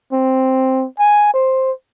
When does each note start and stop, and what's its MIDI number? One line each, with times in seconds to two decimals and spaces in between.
0.12 0.85 60
0.99 1.34 80
1.34 1.71 72